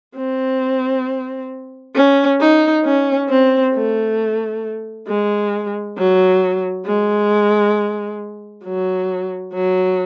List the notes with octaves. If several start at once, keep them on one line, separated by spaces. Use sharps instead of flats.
C4
C#4
D#4
C#4
C4
A3
G#3
F#3
G#3
F#3
F#3